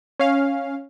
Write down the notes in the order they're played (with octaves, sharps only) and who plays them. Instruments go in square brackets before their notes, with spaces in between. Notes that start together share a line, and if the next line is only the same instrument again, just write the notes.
[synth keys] C#4 F5